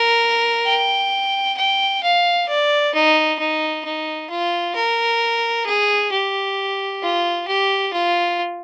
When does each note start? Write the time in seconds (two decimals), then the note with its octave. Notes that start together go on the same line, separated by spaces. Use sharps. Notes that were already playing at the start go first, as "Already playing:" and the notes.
Already playing: A#4
0.66 G5
1.57 G5
2.03 F5
2.48 D5
2.94 D#4
3.39 D#4
3.85 D#4
4.30 F4
4.75 A#4
5.66 G#4
6.12 G4
7.02 F4
7.48 G4
7.93 F4